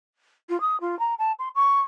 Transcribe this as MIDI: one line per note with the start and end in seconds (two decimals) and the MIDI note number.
0.49 0.60 65
0.61 0.79 87
0.81 0.98 65
0.99 1.14 82
1.18 1.32 81
1.39 1.49 84
1.55 1.80 85